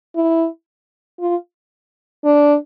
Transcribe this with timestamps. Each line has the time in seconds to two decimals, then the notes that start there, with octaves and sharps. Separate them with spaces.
0.16 E4
1.20 F4
2.24 D4